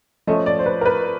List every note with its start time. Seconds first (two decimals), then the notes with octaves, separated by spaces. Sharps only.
0.27 F3 A3 C#4 D#5
0.46 D5
0.59 C5
0.66 B4
0.81 A#4
0.85 B4